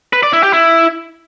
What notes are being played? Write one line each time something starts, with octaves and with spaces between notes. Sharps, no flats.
B4
D5
E4
G4
E4